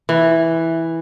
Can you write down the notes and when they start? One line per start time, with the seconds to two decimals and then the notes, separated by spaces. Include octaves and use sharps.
0.09 E3